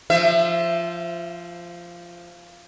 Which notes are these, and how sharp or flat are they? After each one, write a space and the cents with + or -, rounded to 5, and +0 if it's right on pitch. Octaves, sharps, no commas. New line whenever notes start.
F3 -10 C5 +0 E5 +20